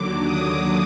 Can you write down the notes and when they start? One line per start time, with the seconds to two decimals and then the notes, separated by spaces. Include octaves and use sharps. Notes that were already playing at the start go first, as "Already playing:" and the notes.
Already playing: D#2 D3 F#3 D6
0.23 D#6